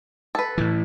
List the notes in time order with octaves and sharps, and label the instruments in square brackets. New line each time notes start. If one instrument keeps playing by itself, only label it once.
[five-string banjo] A4 B4
[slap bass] A2 E3